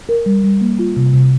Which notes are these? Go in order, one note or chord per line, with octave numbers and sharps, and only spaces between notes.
A#4
G3
G3
A#3
F4
C3
C3